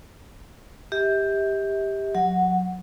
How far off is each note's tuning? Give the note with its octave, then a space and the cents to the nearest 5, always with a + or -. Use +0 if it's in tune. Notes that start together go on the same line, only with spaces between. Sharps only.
G4 +10 E5 -45
F#3 -15 F#5 +0